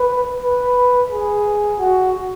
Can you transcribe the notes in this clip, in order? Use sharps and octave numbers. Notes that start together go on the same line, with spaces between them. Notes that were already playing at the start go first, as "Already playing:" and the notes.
Already playing: B4
B4
G#4
F#4